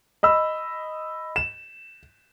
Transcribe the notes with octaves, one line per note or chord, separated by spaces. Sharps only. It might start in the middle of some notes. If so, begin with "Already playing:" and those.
D#5 B5 E6
E7